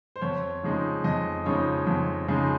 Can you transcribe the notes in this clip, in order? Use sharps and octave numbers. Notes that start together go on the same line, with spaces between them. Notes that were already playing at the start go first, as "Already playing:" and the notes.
C5
F2 C#5
C#3 F3 G#3 D#4
F2 D#5
C#3 F3 G#3 D#4 C#5
F2
C#3 F3 G#3 D#4